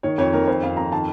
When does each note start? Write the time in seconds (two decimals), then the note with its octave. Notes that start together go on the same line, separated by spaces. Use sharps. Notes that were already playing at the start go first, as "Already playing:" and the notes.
0.03 D#3 C#5
0.18 F2 C#5
0.33 D#3 A#4
0.47 F2 C5
0.62 F2 F5
0.77 F2 A#5
0.92 D#3 A5